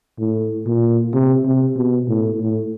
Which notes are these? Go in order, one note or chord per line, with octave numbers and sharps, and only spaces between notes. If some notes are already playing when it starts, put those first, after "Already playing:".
A2
A#2
C3
C3
B2
A2
A2